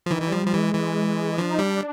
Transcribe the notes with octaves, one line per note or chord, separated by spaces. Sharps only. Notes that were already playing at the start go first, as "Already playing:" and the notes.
F3
D#3 E3
E3
G3
F3
F3 G3
E3 G#3
E3
F3 D4
D#4
G3 D4